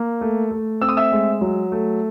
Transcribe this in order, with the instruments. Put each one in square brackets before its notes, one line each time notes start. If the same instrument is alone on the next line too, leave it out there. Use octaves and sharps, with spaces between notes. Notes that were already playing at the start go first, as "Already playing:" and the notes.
Already playing: [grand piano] A#3
A3
A3
C4 E6
D#6
E5 E6
G#3
F#3
A3